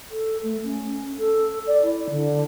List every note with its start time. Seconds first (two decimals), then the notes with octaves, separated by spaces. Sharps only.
0.10 A4
0.43 A3
0.64 C#4
1.19 A4
1.67 D5
1.83 E4
2.10 D3